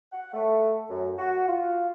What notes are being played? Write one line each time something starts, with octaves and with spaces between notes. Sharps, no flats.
F#5
A3
F#2
F#4
F4